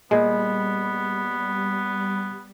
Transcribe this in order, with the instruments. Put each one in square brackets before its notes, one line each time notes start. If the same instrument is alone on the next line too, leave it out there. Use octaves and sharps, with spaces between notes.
[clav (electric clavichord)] A#2 G#3 [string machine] G3 [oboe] B3